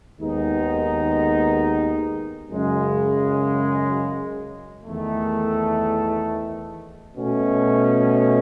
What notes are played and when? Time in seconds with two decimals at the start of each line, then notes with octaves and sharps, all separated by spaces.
0.20 D#2 D#3 G#3 B3 D#4
2.51 F#2 C#3 G#3
4.84 E2 D#3 A3
7.16 B2 A3 C#4